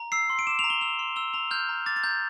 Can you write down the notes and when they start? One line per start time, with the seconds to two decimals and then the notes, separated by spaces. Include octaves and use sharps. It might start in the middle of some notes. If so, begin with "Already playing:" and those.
Already playing: A#5
0.12 E6 C7
0.30 C6
0.39 D7
0.47 D6 E7
0.59 F7
0.64 A#5
0.70 G7
0.81 E6 F7
0.99 C6
1.16 E6 G7
1.34 A#5 F7
1.51 F6 G6
1.69 A#5
1.86 D6 A6
1.96 A6
2.04 A#5 G6